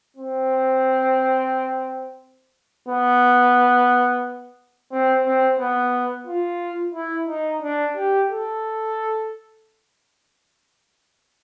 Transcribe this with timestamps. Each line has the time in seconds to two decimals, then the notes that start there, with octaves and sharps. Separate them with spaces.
0.17 C4
2.89 B3
4.92 C4
5.26 C4
5.60 B3
6.27 F4
6.95 E4
7.28 D#4
7.62 D4
7.97 G4
8.30 A4